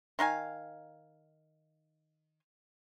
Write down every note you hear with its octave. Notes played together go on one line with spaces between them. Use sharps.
D#3 D#4 F5 G#5